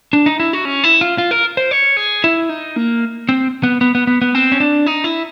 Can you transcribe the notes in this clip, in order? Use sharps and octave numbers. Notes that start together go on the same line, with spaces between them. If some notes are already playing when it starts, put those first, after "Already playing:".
D4
D#4
E4
F#4
C#4
E4
F4
F4
A#4
C5
C#5
G#4
E4
D#4
A#3
C4
B3
B3
B3
B3
B3
C4
C#4
D4
D#4
E4